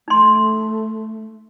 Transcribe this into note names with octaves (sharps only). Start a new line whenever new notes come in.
A3 D#4 C6